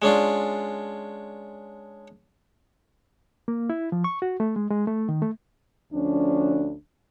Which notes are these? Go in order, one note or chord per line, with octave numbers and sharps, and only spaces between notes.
G#3 C#4 D4 F4
A#3
E4
F3
C#6
F#4
A3
G#3
G#3
A3
D#3
A3
D2 F3 C#4 D4